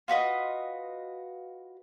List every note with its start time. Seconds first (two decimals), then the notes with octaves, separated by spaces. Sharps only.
0.08 F4 F#4 B4 D#5